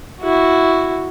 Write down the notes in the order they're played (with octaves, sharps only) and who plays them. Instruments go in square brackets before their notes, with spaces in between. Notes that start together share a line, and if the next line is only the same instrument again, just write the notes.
[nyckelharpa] E4 F#4